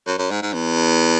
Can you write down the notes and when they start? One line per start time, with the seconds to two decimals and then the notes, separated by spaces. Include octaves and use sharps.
0.07 F#2
0.18 F#2
0.31 G#2
0.42 G#2
0.54 E2